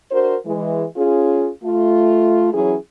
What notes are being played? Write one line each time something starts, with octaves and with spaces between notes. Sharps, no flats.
D4 F#4 A#4 C5
E3 G#3
C#4 F4 G#4
A3 F4
E3 F#3 C#4 E4 G#4